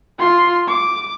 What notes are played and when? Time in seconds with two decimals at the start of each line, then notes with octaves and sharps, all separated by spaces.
0.18 F4 C6
0.67 D6